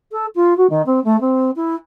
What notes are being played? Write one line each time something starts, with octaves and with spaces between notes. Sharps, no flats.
A4
F4
F#4
D#3
C4
A3
C4
E4